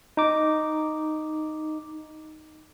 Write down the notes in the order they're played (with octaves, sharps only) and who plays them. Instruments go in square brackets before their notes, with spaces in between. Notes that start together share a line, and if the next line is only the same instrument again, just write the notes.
[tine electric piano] D#4 D6